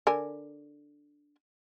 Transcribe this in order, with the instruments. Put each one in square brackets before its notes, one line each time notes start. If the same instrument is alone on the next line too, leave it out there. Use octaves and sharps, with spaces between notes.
[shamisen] D3 A#4 G#5